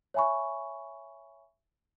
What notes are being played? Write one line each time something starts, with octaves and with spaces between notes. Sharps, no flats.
C#5 E5 G#5 B5 C#6